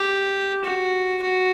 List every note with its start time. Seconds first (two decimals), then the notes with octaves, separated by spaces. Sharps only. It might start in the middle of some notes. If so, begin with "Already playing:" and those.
Already playing: G4
0.64 F#4
1.22 F#4